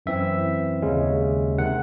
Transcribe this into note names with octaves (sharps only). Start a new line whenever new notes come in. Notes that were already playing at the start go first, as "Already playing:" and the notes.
F#2 E3 C4 E5
D#2 C#3 G#3 C#4
C3 D#3 F#5